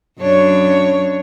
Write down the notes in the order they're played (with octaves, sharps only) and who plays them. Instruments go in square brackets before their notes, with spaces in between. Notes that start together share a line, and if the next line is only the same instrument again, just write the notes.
[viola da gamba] F#2 D4 C#5